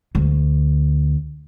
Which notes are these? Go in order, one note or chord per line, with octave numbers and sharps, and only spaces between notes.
D2